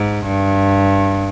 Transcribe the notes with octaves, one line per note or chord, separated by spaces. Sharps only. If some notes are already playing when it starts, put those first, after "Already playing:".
Already playing: G#2
G2